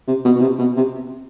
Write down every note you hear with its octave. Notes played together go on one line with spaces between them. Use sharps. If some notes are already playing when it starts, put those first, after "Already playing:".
C3
B2
B2
C3
B2
C3